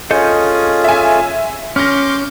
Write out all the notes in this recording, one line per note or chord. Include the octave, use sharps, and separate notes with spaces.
C#4 F4 G#4 A4 D#5 G6
E5 G#5
C#4 C6 D6 F6 G6 A#6